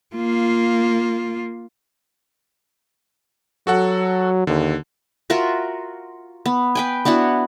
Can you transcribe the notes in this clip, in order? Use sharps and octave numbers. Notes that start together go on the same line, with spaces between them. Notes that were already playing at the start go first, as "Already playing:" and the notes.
A#3 F4
F#3 F#4 A4 F#5
D#2 D3
F4 F#4 A#4 E5
B3
B4 G5 G#5
B3 D4 E4 F#4